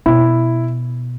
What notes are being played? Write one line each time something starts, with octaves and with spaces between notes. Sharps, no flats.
B2 E4